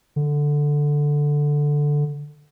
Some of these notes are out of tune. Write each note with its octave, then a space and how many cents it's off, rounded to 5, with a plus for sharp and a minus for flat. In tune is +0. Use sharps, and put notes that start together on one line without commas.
D3 +0